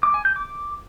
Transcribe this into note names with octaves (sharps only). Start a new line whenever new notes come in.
D6
G#5
G6
D6